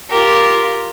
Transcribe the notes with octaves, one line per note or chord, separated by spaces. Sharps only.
F4 G4 A#4